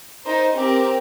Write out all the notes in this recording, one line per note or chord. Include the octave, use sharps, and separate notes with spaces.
D#4 A#4 C5
C4 G4 A#4